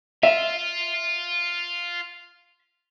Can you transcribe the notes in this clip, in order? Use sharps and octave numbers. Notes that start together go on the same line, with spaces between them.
F4 E5